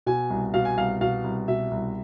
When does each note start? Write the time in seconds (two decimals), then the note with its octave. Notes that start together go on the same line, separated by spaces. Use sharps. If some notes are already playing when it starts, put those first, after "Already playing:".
0.06 B2 G#5
0.30 C2
0.54 B2 F5
0.65 G#5
0.78 C2 F5
1.01 B2 F5
1.24 C2
1.48 B2 E5
1.71 C2